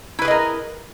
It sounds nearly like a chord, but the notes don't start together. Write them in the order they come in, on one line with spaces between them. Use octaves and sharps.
E4 B4 G#4 D#5 A#4